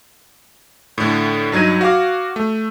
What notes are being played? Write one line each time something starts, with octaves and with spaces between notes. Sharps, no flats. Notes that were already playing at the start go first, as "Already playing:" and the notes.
A2 D3
G2 F#3 D#4 G#6 D#7
F#4 F5 D6
A3